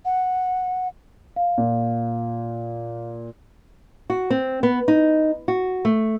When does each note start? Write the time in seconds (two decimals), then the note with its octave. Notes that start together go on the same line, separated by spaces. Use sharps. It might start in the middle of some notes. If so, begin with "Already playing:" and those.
0.05 F#5
1.36 F5
1.58 A#2
4.10 F#4
4.30 C4
4.63 B3
4.88 D#4
5.48 F#4
5.85 A3